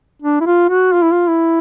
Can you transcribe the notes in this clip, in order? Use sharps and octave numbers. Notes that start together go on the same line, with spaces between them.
D4
E4
F4
F#4
F4
E4
F4
E4